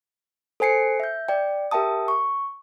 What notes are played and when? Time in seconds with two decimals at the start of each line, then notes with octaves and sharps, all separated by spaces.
0.60 A4 C5 G#5 C7 C#7
1.00 E5 G6
1.28 D5 G5
1.71 G4 A#4 E5 G5 A5 D#6
2.08 C#6